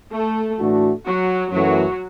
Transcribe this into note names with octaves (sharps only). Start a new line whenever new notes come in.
A3 A4
A2 E3 A3 D4 F#4
F#3 F#4
F#2 E3 F#3 A3 F#4